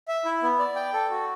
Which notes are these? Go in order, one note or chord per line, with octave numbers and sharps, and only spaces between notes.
E5
E4
B3
D5
G5
A4
F#4